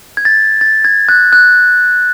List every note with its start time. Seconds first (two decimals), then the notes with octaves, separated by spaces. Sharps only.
0.17 G#6
0.25 A6
0.61 A6
0.85 G#6
1.09 F#6
1.32 F#6